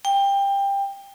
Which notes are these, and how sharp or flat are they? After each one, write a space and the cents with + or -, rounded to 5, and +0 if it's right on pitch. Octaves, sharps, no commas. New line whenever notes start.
G5 +20